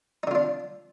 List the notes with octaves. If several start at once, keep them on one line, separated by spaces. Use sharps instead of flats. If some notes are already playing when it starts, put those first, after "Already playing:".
D3 D4 D#4 F4